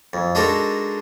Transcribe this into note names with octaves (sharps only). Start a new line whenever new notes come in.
F2
G#3 D4 D#4 F#4 A4 A#4